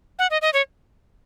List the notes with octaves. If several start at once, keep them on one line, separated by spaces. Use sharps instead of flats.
F#5
D#5
D#5
C#5